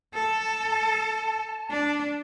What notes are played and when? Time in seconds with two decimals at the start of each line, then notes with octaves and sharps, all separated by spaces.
0.14 A4 A5
1.70 D4